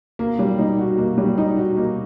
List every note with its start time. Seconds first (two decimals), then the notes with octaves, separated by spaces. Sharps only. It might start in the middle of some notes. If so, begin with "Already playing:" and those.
0.19 A#3
0.39 G3
0.59 D#4
0.79 F#4
0.98 A#3
1.18 G3
1.38 D#4
1.57 F#4
1.77 A#3